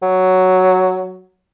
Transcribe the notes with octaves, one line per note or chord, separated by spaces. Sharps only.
F#3